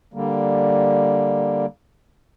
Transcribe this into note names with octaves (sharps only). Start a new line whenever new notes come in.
D3 G3 A#3